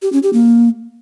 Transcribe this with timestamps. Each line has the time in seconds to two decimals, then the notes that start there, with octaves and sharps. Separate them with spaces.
0.02 G4
0.13 C#4
0.23 G4
0.33 A#3